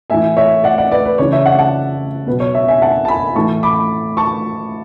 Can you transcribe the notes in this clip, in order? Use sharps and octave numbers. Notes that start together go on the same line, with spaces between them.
A2 E3 E5 G#5
C#5 E5
D5 F#5
D5 F#5
B4 D5
B4
C#3 E3 C#5
C#5 E5
D5 F#5
F#5 A5
B2 F#3 B4
C#5
C#5 E5
E5 G#5
F#5 A5
A5
G#5 B5
A2 E3 A5 C#6
B5 D6
A5 C#6